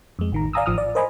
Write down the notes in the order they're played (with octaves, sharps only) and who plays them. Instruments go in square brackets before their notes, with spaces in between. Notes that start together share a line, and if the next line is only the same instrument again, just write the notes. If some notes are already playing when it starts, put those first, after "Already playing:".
[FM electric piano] F2 G#3
A1 D#3 A#5
D5 F5 G#5 A#5 D#6 E6
A1 F3 D#6 F6
D5
A#4 C5 D#5 G#5 B5